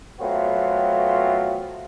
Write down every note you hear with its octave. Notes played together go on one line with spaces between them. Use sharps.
F#3 A3 B3 C4 F4